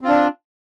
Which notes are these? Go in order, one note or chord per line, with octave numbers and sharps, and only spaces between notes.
C4 D4 F4